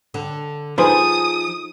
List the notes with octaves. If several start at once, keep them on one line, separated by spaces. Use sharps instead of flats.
D3
F3 D#4 G#4 B4 C5 D#6